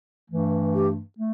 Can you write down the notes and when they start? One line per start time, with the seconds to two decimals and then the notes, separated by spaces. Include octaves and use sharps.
0.30 G2 E3 A3
0.74 G4
1.19 A3